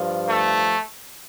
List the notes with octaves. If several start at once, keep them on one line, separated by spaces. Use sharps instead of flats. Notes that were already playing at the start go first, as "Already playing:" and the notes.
Already playing: G2 F3
A3